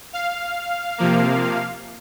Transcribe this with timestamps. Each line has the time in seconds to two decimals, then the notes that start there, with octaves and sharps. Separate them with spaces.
0.13 F5
0.98 C3 F3 A#3